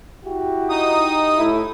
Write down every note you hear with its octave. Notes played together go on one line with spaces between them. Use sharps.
E4 F#4 G4
D#4 D#6
A2 E4